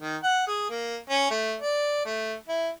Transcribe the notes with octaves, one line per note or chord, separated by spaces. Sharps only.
D#3
F#5
G#4
A#3
C#4
A3
D5
A3
E4